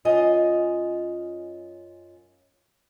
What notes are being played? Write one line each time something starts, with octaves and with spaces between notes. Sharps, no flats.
F#2 F4 D#5 G#5